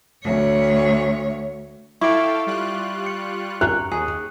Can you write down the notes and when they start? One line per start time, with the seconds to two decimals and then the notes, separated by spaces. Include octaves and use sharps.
0.24 D2 C#5
2.01 E4 A4 F5 G5 C#6 D6 D7
2.47 G3 F4 F#6
3.06 C#7
3.61 A#4 F#6
3.92 D#2 G#4